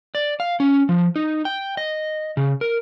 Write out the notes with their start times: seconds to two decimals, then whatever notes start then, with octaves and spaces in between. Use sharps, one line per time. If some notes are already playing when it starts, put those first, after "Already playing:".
0.15 D5
0.40 F5
0.60 C#4
0.89 F3
1.16 D#4
1.45 G5
1.77 D#5
2.37 C#3
2.61 A#4